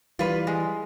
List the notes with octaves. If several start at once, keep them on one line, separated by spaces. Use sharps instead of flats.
E3 G3 F4 B4
G#3